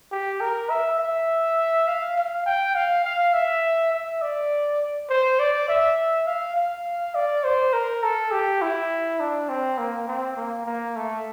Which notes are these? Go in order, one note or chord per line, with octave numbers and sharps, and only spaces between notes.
G4
A#4
E5
E5
F5
F5
G5
F5
F5
E5
E5
D5
C5
D5
E5
F5
F5
D5
C5
A#4
A4
G4
E4
D4
C4
A#3
C4
A#3
A#3
A3